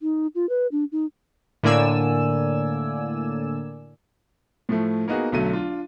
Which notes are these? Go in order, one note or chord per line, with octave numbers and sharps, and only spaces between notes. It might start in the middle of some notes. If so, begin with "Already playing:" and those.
D#4
F4
B4
D4
D#4
A2 D3 A#3 D5 G#5 E6
A2 F3 A3
A#3 B3 D#4 F#4 G#4
B1 D3 F#3 A3 D#7
D4 F4